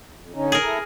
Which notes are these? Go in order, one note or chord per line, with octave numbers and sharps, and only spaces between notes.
F2
D3 C#4 D#4
G#4 A#4
E4 A4 A#5